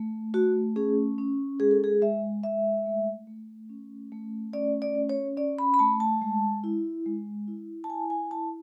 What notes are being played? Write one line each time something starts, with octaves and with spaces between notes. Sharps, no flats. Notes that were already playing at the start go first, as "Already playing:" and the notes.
Already playing: A3
A3 F#4
C#4 G#4
C#4
G#3 G#4
A4
G#4
G#3 E5
G#3 E5
A3
A3
C#4
A3
C#4 D5
D5
C#4
C#5
C#4 D5
B5
B5
A3 A5
A5
G#3
E4
G#3
E4
A5
E4 G#5
G#5
E4 A5